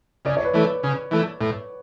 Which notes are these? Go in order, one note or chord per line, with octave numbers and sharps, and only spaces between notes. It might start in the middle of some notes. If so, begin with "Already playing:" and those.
C#3 D5
C#5
B4
E3 A3
C#3
E3 A3
A2